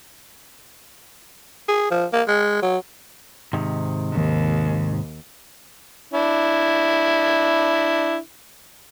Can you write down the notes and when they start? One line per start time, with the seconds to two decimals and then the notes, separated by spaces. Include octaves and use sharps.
1.69 G#4
1.91 F3
2.13 A#3
2.28 G#3
2.62 F#3
3.53 G#2 C3 D#3
4.12 D#2
6.13 D4 E4